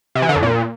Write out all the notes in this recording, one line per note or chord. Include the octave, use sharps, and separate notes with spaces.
C3
E3
D3
F2
A#2